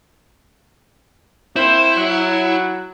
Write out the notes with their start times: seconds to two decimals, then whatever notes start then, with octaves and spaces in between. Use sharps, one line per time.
1.56 A#3 C4 E4 C5
1.96 F#3